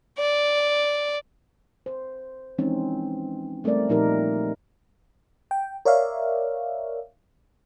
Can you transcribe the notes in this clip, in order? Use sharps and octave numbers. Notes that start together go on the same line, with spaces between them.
D5
C5
E3 F3 G#3 C4 C#4 D#4
G3 A3 C4 A#4 D5
A#2 F3 D#4 G4 A#4
G5
A#4 C#5 D5 E5 F5